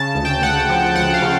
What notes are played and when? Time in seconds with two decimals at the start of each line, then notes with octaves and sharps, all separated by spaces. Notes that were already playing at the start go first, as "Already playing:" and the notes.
Already playing: C#3 A5
0.15 D2
0.25 G5
0.42 D2 F#5
0.69 F3
0.95 D2 F#5
1.14 F5
1.22 C#3